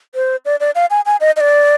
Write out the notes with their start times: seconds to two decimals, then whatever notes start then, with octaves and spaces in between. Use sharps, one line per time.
0.15 C5
0.45 D5
0.60 D5
0.75 F5
0.90 G#5
1.06 G#5
1.21 D#5
1.36 D#5
1.40 D5